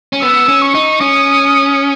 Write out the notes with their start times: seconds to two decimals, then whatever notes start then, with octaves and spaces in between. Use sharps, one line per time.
0.13 C#4
0.22 B3 E6
0.49 C#4
0.62 C#6
0.75 D#4
1.01 C#4 D#6